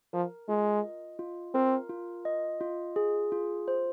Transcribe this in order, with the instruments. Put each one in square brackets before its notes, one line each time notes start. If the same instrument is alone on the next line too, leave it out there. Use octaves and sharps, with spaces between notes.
[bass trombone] F3 [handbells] A#4
[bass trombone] G#3 [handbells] F4
[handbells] D#5
F4
[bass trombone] C4 [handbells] A#4
[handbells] F4
D#5
F4
G#4
F4
C5